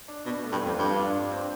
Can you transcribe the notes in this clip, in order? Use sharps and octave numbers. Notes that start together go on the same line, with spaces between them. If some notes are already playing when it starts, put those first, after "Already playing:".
D4
B2 D4
A3
G2
F2 F4
G2 F4
D4
D4
C4